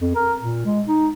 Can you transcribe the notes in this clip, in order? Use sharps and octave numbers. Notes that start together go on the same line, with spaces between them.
F2
A#4
A#2
G#3
D#4